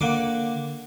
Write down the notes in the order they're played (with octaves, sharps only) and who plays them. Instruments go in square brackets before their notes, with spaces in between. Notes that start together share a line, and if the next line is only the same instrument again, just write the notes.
[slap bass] D3 [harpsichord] A#3 F#5 D6